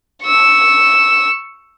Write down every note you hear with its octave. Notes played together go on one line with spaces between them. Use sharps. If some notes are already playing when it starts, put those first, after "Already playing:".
C#6 E6